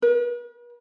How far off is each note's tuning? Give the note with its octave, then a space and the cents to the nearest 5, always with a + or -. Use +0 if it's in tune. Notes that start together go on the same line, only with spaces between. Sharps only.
B4 -45